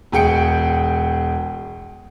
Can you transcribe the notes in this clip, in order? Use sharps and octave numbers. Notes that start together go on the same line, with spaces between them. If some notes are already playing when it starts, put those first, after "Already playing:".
E1 G#4 G5 C#7